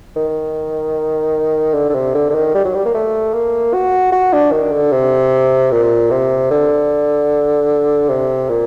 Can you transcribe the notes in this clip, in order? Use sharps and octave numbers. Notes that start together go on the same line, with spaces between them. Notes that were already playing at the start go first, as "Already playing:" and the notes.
D#3
D3
D3
C3
D3
D3
D#3
G3
F#3
G3
A#3
A3
A#3
F#4
F#4
D4
D#3
D3
C3
A#2
C3
D3
C3
A#2